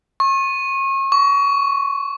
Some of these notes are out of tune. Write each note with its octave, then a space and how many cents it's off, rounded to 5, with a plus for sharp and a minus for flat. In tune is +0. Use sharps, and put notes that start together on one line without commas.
C#6 -35
C#6 +25